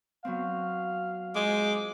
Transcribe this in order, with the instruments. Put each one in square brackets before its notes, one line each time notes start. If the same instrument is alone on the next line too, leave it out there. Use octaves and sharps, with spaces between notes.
[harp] F#3 B3 C4 [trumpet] F5
[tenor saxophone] G#3 [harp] F4 G#4 C5 [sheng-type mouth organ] D6